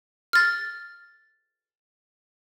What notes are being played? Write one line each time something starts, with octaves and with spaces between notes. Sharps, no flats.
F6 A6